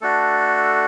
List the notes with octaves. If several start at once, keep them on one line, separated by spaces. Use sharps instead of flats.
A3 D4 F#4 A4